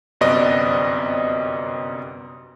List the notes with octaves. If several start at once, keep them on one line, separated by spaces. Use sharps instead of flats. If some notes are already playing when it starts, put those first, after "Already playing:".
G1 F#2 C3 B3 D5 D#5